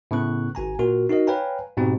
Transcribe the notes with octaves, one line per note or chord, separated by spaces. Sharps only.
A2 C#3 B3 C#6 F#6
G#1 G#5 A#5
A#2 F#4 A#4
D#4 F#4 A#4 D#5
B4 C#5 F5 G5 G#5 A#5
G#2 B2 C4 G4